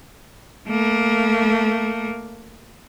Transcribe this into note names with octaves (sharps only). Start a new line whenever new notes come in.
A3 A#3